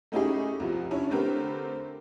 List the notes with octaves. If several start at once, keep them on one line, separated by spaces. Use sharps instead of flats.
A3 C#4 D#4 E4 G4 G#4
C2 F3
C#4 D4 E4 C#5
D3 A3 C4 G4 A#4 B4